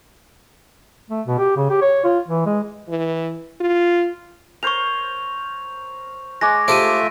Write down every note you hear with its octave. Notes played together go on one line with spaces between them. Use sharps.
A3
B2
G4
C#3
G4
C#5
F4
E3
G#3
E3
F4
A#4 C5 C#5 C#6 F7
G#3 C#5 D6 A#6
A3 F4 G4 A4 C5 E5 D7 D#7